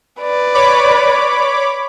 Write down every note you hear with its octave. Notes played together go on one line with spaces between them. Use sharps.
B4 D5
C#5 B5 D6